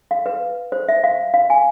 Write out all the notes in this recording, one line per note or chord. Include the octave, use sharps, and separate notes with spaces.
F5
B4
C5
E5
F5
F5
G#5